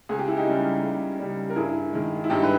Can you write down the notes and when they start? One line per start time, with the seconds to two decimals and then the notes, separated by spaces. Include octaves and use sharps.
0.09 C#2 G#4
0.19 G4
0.28 E4
0.36 D#4 G4
0.46 C#3 G3
0.83 C#2
1.19 C#3 G3
1.50 A#4
1.56 G2 E4 G#4
1.93 D#3 G#3
2.24 E4
2.30 G2 D#4 G4
2.43 B4